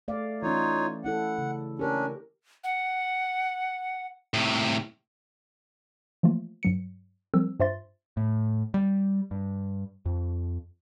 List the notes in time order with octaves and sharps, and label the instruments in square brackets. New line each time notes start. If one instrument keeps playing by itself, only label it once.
[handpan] A3 D5 F5
[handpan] E3 C#4 [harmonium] D#4 F4 C#5
[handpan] A3 E4 A4 [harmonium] F#5
[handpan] C#3
[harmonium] C#4 D4 [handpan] G4 A#4
[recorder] F#5
[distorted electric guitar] A2 C3
[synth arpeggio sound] E3 F3 A3 A#3 F4
G2 F#3 C#7
F3 G3 C4 A#4 E6
G2 F4 C5 E5 C6 A6
[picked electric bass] A2
G3
G2
F2